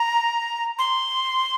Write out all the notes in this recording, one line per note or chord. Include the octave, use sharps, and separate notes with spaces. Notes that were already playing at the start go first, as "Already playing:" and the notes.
Already playing: A#5
C6